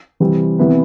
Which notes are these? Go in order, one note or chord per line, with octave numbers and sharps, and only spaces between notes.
C3 E3 G3 C4
C3 E3 B3 E4 B4